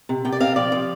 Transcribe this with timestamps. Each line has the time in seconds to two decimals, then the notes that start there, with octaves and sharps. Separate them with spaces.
0.09 C3
0.25 C3 G5
0.32 D5
0.40 C4 F5
0.56 F3 D5
0.72 F3